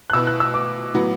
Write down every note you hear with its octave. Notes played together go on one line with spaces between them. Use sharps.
F#6
B2 B3 E4 E6
F#6
E6
D6
A2 F#3 B3 F#4